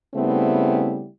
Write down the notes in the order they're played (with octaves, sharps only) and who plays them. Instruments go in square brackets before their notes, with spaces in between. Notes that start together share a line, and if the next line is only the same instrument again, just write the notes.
[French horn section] C#3 G3 A3 B3 C4 E4